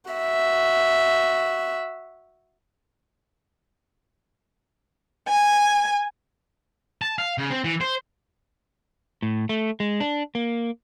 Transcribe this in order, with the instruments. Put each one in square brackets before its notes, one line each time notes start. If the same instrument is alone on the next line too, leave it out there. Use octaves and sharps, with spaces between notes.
[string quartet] F#4 E5
G#5
[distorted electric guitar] A5
F5
C#3
C4
E3
C5
[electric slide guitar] A2
A3
G#3
D4
A#3